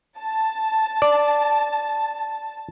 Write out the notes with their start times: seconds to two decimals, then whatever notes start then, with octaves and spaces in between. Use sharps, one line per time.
0.18 A5
1.02 D5